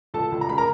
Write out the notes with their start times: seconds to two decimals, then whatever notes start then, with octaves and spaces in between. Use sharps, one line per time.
0.14 C#2 A4 A5
0.32 C#2
0.41 A#5
0.49 C#3 B5
0.58 A#4 A#5